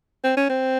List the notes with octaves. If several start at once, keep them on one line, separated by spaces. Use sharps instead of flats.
C4
C#4
C4